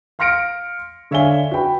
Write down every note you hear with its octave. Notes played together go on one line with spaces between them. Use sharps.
F5 C6 F6 A#6 C#7 D7
D3 C#5 E5 F5 G#5 G7
F#4 B4 G5 B5